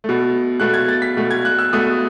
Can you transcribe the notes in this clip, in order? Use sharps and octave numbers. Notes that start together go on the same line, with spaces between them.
B2 A3
B2 A3 F#6
G#6
A6
B6
B2 A3
G#6
F#6
E6
B2 A3 D#6